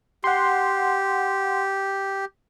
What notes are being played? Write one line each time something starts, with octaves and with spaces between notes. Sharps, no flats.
G4 F#5 C6